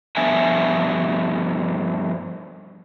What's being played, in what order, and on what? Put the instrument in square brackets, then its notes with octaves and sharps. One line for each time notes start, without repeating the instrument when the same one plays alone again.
[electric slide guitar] G2 F3 B3 D4 E5 G#5